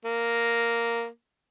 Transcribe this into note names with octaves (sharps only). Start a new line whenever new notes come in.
A#3